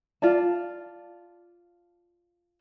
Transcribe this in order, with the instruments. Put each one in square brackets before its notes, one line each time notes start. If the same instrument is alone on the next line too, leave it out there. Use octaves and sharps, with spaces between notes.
[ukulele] F4 D5 A5